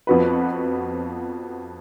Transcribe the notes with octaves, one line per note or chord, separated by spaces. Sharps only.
F2 F3 B3 F#4 B4